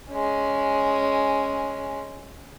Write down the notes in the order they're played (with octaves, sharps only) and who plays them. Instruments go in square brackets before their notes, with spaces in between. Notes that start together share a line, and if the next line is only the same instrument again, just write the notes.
[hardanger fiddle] G#3 C#4